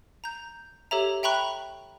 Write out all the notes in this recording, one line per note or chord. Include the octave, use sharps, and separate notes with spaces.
A#5 G6
G4 A4 C#5 E5 A#5
E5 G5 A#5 B5 C#6 F#6